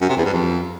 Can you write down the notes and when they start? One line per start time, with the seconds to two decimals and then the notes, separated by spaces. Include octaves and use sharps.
0.01 F#2
0.09 C3
0.17 E2
0.25 G2
0.33 F2